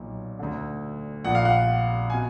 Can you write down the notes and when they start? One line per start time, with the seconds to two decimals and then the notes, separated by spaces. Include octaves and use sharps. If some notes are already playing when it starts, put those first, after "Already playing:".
Already playing: B1 A#2
0.39 D2 D3
1.25 A#1 A#2 F#5
1.35 F5
1.45 F#5
2.10 B2 G#5